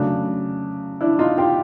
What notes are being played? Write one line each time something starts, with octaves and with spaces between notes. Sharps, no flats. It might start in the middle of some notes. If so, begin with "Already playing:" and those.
Already playing: C#3 F#3 A3 D4
D4 E4
D#4 F4
F4 G4